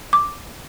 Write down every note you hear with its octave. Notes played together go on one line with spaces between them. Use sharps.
D6